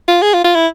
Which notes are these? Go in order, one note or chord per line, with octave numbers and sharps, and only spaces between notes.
F4
G#4
F4
F4
E4